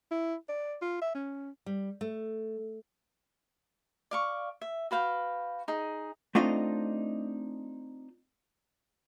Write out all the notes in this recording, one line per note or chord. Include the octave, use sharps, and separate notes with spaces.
E4
D5
F4
E5
C#4
G3
A3
D5 F5 C#6
E5
F#4 B4 F5 G5
D#4 G#4
A3 C4 D4 D#4 F4 D#5